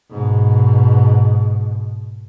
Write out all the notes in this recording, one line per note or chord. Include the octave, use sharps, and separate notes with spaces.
G#2 B2